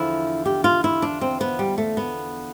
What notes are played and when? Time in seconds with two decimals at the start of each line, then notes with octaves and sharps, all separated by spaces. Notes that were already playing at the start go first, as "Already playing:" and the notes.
Already playing: E2 D3 F3 E4
0.46 G4
0.64 F4
0.84 E4
1.02 D4
1.21 C4
1.41 B3
1.59 G3
1.78 A3
1.97 B3